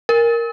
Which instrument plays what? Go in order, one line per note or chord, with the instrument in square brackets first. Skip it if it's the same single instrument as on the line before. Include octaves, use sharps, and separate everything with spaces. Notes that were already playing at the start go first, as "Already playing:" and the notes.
[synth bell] A#4